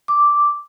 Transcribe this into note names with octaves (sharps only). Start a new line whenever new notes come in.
D6